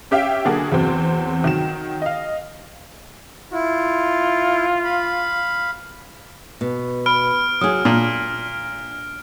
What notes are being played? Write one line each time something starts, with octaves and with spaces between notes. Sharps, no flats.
C#4 G4 E5 F5 G5
D3 F#3 A#3 D4 F#4 G#4
E2 F#3 C4
D#3 F#3 E7
D#5 F5
E4 F4
F5 B5
B2
B4 B5 F6 D7
F#3 G#4 D#6
A#2 D4